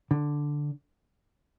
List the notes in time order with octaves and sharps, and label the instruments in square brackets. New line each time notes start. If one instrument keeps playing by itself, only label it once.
[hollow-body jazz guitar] D3